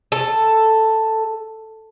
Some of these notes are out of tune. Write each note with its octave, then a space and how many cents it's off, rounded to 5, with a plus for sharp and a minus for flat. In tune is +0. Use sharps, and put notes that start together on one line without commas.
A4 +5